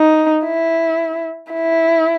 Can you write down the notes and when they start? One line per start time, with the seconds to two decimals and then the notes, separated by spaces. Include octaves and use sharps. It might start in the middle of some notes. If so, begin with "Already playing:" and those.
Already playing: D#4
0.46 E4
1.52 E4